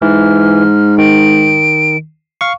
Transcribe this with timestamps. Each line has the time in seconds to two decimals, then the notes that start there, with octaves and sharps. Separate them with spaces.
0.02 G#2 E3 F6
0.98 D#3 D7
2.41 F5 C#6